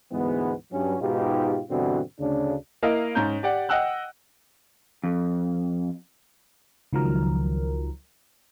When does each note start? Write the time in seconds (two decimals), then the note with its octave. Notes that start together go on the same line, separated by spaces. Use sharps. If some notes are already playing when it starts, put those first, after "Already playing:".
0.12 D2 G#2 E3 G#3 B3
0.72 G2 F#3 C#4
1.01 G#2 B2 D#4 F4 G4
1.70 G2 B2 D3 E3 C4 F#4
2.20 D2 C#3 D4
2.83 A#3 E4 A#4 D#5 F5
3.15 G#2 C#4 A#5 G6
3.43 G4 D5 F#5
3.69 D#5 F#5 G5 E6 F#6
5.04 F2
6.93 C#2 D#3 F3 F#3 A#4